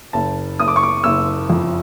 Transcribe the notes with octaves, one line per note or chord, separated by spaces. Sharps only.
F#1 A5
F#1 D#6
D6
C#6
D6
F#1 E6
F2